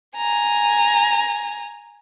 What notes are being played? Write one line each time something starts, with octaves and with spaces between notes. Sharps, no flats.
G#5 A#5